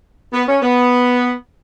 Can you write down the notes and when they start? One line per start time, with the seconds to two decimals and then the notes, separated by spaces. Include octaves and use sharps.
0.32 B3
0.47 C#4
0.62 B3